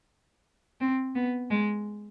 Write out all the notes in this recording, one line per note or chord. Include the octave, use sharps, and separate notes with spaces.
C4
B3
G#3